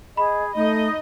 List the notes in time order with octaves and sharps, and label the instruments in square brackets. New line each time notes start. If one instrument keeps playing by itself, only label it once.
[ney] G#4 [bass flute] D#5 [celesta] B5
[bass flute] A3 [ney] D#4 [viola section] D#5